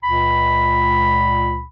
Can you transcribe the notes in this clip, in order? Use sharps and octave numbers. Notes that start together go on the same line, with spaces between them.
C#2 A#2 B5